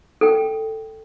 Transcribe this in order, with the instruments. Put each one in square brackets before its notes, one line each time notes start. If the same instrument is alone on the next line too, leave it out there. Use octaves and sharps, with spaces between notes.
[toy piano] A4 G5